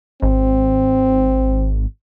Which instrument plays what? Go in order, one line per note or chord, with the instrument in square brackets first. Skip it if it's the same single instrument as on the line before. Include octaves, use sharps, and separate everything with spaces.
[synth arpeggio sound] G#1 [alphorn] C4